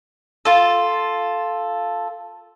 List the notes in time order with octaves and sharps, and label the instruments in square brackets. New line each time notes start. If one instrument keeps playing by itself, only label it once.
[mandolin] F4 A4